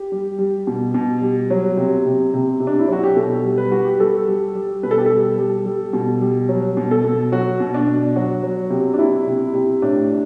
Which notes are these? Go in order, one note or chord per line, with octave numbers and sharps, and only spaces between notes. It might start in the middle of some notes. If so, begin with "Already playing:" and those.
Already playing: G4
G3
G3
B2
B2
G3
F#3
C3
C3
C3
C3
D4
E4
F#3 F#4
G4
B2 A4
G3
B4
G3 F#4
G4
G3 A4
G3
G3
B2 B4
A4
G4
G3 A4
G3
G3
B2
G3
F#3
B2
A4
B2
F#3 F#4
B2
D4
B2
F#3 F#4
F#3
C3
D4
C3 E4
C3
C3
A2 D4